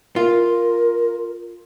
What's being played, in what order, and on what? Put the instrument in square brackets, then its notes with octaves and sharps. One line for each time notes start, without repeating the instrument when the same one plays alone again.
[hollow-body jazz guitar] F4 [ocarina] A#4